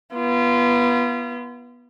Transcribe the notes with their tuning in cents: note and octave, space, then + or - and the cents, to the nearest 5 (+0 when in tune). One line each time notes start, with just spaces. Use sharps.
B3 -20 F4 -35